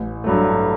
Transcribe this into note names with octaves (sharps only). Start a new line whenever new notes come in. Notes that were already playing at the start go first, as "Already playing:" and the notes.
Already playing: A1
G2 F#3 A3